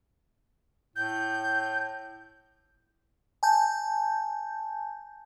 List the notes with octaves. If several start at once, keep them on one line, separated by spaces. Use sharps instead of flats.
A2 G6
G#5 A5 G6